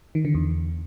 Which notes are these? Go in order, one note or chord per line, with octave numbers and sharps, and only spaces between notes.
D#3
D3
E2